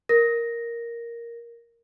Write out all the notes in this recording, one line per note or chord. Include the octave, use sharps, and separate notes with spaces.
A#4 A#6